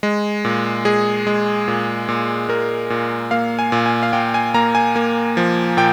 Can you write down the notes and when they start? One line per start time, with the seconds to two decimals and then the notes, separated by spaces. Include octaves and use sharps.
0.03 G#3
0.45 A#2
0.85 G#3 G#4
1.27 G#3
1.68 A#2
2.09 A#2
2.48 A#2 A#4
2.90 A#2
3.31 A#3 F5
3.59 G#5
3.72 A#2
3.86 G#5
4.03 F5
4.13 A#2 G5
4.34 G#5
4.54 A#3 A#5
4.75 G#5
4.96 A#3
5.37 F3
5.77 A#2 G5